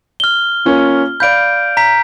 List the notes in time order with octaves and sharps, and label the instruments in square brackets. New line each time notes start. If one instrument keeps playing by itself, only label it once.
[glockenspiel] F6 G7
[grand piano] A#3 C#4 F4
[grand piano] D5 F5 B5 [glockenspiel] G6 D7
[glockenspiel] A#5 B6